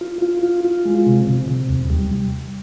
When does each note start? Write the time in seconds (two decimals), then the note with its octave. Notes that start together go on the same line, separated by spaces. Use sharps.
0.01 F4
0.22 F4
0.43 F4
0.65 F4
0.85 G#3
1.07 C3
1.27 C3
1.48 C3
1.69 D#2
1.90 G3